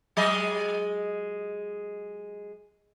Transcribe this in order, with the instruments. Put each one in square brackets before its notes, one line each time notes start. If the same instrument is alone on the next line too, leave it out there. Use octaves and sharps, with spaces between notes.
[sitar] F#3 G#3 D#5